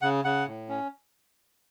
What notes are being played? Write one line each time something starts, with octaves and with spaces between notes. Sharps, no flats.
C#3 F#5
C#3 F#5
A2
C#4